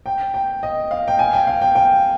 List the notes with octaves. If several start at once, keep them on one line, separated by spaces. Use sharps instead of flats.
G5
G5
D#5
F5
G5
G#5
G5
F5
G5
G5